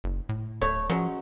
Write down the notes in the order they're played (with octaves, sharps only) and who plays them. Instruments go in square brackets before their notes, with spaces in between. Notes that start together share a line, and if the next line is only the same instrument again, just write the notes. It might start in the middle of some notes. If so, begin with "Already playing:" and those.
[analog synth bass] F#1
A2
[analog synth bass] D1 [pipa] A3 C#5
[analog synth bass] F3 [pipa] F#3 G#3 C#4